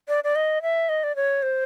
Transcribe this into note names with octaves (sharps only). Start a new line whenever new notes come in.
D5
D5
D#5
E5
D#5
D5
C#5
C5